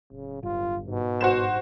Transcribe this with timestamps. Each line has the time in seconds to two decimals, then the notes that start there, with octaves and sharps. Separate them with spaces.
0.12 D1 C#3
0.43 G1 F4
0.88 G#2 B2
1.21 G1 F#4 C5 E7